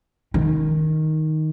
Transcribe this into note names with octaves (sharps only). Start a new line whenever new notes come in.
D#3